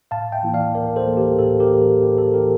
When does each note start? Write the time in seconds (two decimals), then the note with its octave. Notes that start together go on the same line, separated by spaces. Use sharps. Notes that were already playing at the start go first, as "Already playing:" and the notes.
0.11 A2 F5 A5
0.32 E5 G5
0.43 E3 A#3 E4
0.54 D5 F5
0.74 A2 A#4 D5
0.96 A4 C5
1.07 E3 A#3 E4
1.17 G4 A#4
1.39 A2 A4
1.60 G4 A#4
1.70 E3 A#3 E4
1.82 A4
2.02 A2 G4
2.18 A4
2.34 E3 A#3 E4 G4 A#4